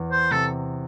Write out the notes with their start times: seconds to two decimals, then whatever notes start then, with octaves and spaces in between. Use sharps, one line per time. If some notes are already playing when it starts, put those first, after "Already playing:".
Already playing: E2
0.12 C5
0.31 C3 A4